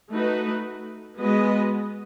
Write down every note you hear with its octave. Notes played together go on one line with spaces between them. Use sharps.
A3 D#4 F#4 B4
G#3 B3 F#4 B4 D#5